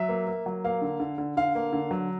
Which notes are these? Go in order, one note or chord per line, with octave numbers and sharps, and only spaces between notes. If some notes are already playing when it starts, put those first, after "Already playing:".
Already playing: F#3 E5
A#3
A#3
F#3
A#3 F5
D3
D3
D3
D3 F5
A#3
D3
F#3